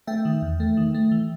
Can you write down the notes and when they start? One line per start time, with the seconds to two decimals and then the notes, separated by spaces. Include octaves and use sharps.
0.07 A3 E5 G5
0.25 D#3
0.42 E2
0.60 A3
0.77 D#3
0.94 A3
1.12 E3